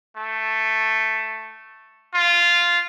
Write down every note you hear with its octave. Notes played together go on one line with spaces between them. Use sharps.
A3
F4